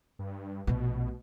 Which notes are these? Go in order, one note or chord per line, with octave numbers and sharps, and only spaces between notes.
G2
A#1 B2 A3